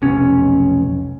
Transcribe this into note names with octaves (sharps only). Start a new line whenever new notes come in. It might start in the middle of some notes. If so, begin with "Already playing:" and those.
F1 B1 C#4